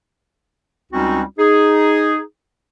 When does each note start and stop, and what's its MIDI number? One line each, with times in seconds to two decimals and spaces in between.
0.92 1.21 37
0.92 1.21 55
0.92 1.21 60
0.92 1.21 61
0.92 1.21 63
0.92 1.21 66
1.38 2.18 63
1.38 2.18 68